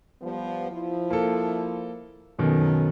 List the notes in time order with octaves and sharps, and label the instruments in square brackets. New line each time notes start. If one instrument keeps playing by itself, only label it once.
[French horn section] F3 G3 B3
F3 E4
[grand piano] A#3 A4
[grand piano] F#2 B2 D#3 [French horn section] C#4 D#4 A4